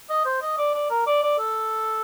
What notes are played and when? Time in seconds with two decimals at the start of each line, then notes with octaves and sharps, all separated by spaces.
0.10 D#5
0.25 C5
0.42 D#5
0.58 D5
0.74 D5
0.90 A#4
1.07 D5
1.22 D5
1.39 A4